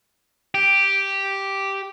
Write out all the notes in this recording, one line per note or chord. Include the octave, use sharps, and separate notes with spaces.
G4